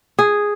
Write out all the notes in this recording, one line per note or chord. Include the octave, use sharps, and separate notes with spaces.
G#4